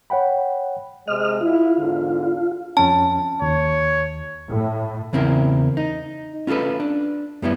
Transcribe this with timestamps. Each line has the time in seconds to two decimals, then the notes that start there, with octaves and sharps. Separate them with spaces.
0.10 C#5 F#5 G5 B5
1.08 C3 G#3 D#5 F6
1.41 E4 F4
1.78 E2 G#2 D3
2.77 F2 C#4 A5
3.42 D#2 C#5
4.49 A2
5.13 E2 C#3 C4 E4 A#4
5.77 D#4
6.47 C#4 F4 F#4 A4 B4
6.80 D4
7.42 F#2 G3 B3 E4